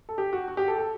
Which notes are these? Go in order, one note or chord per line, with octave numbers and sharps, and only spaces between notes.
A4
G4
F#4
F#4
G4
A4
A4